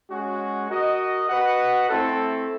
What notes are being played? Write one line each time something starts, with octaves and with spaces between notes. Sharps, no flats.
G#3 C#4 F#4
F#4 A#4 D#5
F#4 B4 D#5 F#5
A3 C4 E4 A4